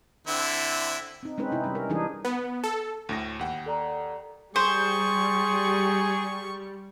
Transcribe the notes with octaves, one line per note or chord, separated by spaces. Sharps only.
D3 C4 E4
C4 D#4
G#3 C4 C#4 D#4 B4
C3 D#4 E4
G3 C#4
A#4
E3 G3 D4 D#4 G#4
B3
A4
D2 A2 A#6
D#2 F#5 G5
A4 D5 A#5
G3 G#4 C5 C#6